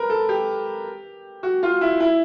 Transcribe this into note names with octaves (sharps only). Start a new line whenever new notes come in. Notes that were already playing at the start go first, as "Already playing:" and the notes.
Already playing: A#4 B4
A4
G4
F#4
F4
E4
E4